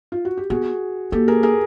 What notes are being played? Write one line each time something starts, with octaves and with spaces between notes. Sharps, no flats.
F4
F#4
G4
B3 F#4 G#4
A#3 G4 A4
G#4 A#4
G#4 A#4